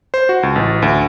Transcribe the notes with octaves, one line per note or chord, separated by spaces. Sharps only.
C5
F#4
C#2
A1
D2